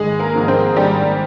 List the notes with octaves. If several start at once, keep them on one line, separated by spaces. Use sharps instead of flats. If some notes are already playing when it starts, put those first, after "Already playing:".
Already playing: G#1 G#3 G#4
A#3 A#4
G#2 F3 C4
C4 C5
G#1 G3 G4